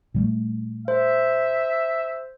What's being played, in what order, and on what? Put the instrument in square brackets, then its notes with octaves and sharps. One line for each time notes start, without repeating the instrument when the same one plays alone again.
[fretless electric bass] A#2 G3 A3
[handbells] C5 [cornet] E5